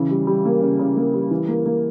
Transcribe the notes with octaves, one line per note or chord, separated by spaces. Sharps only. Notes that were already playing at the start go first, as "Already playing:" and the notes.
Already playing: C#3 E3
G3
G3
A#3
C#3
C#3
A#3
G3
E3
A#3
A#3